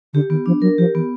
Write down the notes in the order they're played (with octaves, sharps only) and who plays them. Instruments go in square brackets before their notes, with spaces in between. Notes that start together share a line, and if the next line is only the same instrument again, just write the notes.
[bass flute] D3 [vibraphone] G4
[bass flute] D#3 [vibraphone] B3
[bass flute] F3 [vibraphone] D4
[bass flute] F#3 [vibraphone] A#4
[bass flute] F3 [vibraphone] G4
[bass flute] E3 [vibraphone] B3